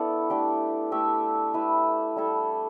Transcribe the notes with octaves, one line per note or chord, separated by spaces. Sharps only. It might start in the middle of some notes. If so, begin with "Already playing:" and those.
Already playing: B3 D4 E4 A4 D5
A3 D4 G4
A3 G4 E5
E4 B4 E5
G3 E4 A4 E5